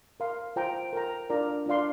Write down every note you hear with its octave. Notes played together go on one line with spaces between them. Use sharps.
A#4 F5 C6
F4 C5 G5 A#5
A#4 G5 A#5
D4 F4 A#4 D5 A#5
D4 F4 D5 F5 C6